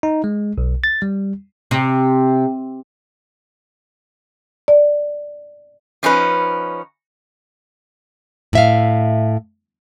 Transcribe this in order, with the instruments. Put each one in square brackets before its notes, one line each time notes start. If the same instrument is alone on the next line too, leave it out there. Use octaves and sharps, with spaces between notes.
[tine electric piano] D#4
G#3
B1
A6
G3
[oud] C3
[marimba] D5
[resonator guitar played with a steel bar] F3 C#4 D#4 B4
[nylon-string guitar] A2 E5 F5